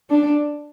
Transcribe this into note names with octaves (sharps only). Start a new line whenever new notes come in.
D4